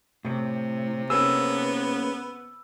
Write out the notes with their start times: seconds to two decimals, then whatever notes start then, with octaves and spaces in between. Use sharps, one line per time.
0.25 A2 C3
1.10 A#3 B3 C#4 G#4 E6